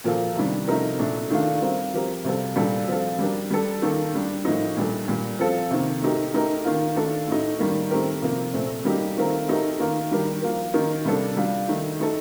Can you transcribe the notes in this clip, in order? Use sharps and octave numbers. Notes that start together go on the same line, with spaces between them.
A#2 F3 A#3 F4 A4
C3 D#3 G3 D4
C3 F3 A3 D#4 A#4
A#2 A3 D4
D#3 A3 D4 F4
G3 C4 F4 A#4
F3 C4 G4 A#4
C3 G3 C4 F4 A4
A#2 G3 D4 F4 A4
F3 C4 F4 A4
G3 D4 G4 A#4
G3 D4 A4
D#3 A#3 F4 A4
D3 G3 D4
A2 F3 A#3 D#4
A#2 G3 D4 A4
A#2 G3 A#3
F3 C4 F4 A4
C3 D#3 A#3
A3 D#4 G4 A#4
A3 D#4 G4 A#4
D#3 A#3 F4
D#3 A3 D4 F4 A4
A2 A3 D#4
D#3 G3 A#3
D#3 A3 C4 G4 A#4
C3 F3 A#3
A#2 A3 C4
G3 A#3 D#4 G4
D#3 A3 C4 F4 A#4
A3 D#4 G4 A#4
D#3 A#3 F4 A#4
D#3 G3 D4 G4 A#4
F3 A#3 F4 A#4
D#3 A#3 D#4 A#4
C3 G3 A#3 D4 A4
G3 D4 F4
D#3 A3 D#4
A3 D#4 A4